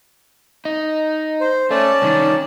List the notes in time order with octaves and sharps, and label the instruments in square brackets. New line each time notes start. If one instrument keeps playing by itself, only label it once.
[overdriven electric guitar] D#4
[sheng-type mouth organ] C5
[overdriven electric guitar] A3 [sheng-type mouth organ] C#4 D5 A5
[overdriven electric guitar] C2 D#3